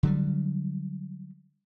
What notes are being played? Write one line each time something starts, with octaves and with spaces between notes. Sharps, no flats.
D3 F#3 G3